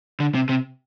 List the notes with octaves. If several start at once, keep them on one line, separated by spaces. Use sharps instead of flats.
D3
C3
C3